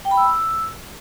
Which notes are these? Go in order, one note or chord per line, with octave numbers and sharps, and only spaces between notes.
G5
B5
E6